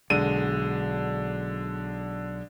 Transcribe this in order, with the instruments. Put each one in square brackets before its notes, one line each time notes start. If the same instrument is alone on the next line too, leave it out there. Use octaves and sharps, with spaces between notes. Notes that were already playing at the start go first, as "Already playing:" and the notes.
[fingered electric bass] B1 [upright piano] D3 G#3 D#7